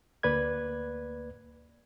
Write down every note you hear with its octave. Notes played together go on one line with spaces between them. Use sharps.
D2 A#3 B4 D5 G#6